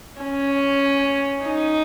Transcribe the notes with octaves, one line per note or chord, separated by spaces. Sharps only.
C#4
D#4